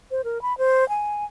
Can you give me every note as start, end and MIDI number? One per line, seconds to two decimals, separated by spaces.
0.11 0.21 72
0.24 0.41 70
0.42 0.56 83
0.58 0.87 72
0.89 1.25 80